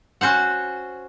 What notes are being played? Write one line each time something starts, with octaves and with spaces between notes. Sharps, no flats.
C#4 F#4 C5 F#5